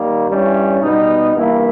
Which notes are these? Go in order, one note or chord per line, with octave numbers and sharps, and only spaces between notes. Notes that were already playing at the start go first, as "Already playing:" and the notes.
Already playing: D#3 G3 A#3 D#4
G2 G3 C#4 E4
B2 G3 B3 D#4
G2 E3 A#3 E4